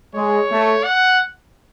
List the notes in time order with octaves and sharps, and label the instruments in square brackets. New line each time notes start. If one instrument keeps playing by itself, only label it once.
[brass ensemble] G#3 [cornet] C#5
[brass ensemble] A3
[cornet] F#5